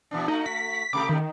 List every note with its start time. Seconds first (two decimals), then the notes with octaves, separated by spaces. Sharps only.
0.11 A#2 E3 D4
0.28 A3 D#4 F#4
0.46 B6
0.93 C3 A3 G4 D6
1.09 D#3